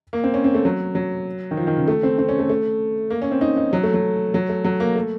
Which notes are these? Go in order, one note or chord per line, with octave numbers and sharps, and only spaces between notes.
A#3
C4
C#4
C4
A3
F#3
F#3
D#3
F3
D#3
C#3
A3
C4
C4
C#4
A3
A3
A#3
C#4
C4
D#4
D#4
F#3
A3
F#3
F#3
A3
F#3
A#3
A3